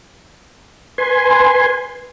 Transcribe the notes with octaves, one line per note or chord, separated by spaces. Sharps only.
B4 G#5 C6